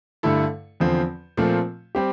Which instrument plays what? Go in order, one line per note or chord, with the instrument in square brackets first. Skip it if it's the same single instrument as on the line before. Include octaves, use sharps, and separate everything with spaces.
[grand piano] G2 D3 A3 E4 A4
E2 D3 F3 C4
A#2 F3 A3 C4
G3 C4 G4